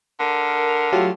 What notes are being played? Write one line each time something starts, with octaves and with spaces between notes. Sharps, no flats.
D3 A#4
F#3 A3 E4 F4 G4